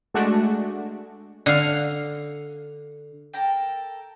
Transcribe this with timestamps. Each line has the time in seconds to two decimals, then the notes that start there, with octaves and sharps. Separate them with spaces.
0.14 G#3 A3 D4 F#4
1.46 D3 F5
3.34 A4 A#4 G5